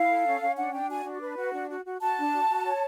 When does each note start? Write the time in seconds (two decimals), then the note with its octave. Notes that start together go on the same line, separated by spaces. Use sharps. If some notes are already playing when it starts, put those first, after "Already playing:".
Already playing: E4 F5
0.09 A4
0.26 C#4
0.41 C#4
0.57 D4 F#5
0.73 D4 G5
0.89 F#4 G#5
1.05 D4
1.21 B4
1.37 F#4
1.53 D4
1.70 F#4
1.85 F#4
2.01 F#4 A5
2.18 D4
2.34 F#4
2.50 F#4
2.66 C#5